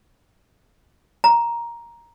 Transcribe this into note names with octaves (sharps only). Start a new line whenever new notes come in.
A#5